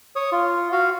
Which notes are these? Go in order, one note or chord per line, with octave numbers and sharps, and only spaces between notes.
C#5 D#6
F4
F#4 F5